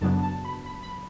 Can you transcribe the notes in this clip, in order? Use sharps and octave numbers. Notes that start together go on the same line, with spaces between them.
F#2 C#3 F#3 B3 D4 A5
A5
B5
B5
B5